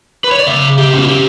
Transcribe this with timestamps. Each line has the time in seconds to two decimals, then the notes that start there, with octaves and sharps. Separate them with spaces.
0.24 B4
0.31 C#5
0.40 D5
0.47 C#3 E5
0.78 G4
0.94 C#4
1.00 F#4
1.09 G4